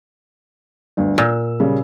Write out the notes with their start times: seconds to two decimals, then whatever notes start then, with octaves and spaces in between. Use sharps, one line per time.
0.97 G1 D2
1.18 A#2 E6
1.60 C#3 G3